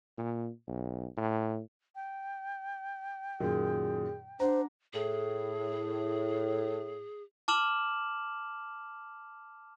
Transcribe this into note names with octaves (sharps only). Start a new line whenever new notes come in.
A#2
B1
A2
G5
F#2 A#2 D#3 G#4
D4 C5 F#5 A#5
A2 G#4
A5 D6 F6 E7 F#7